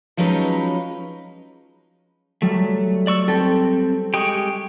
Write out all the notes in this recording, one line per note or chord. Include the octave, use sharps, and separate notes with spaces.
F3 F#3 G#3 C#4 D#4 B4
F#3 G3 A3
D5 C#6 E6
C4 G4 A4
G#3 G4 G5 C#6 D#6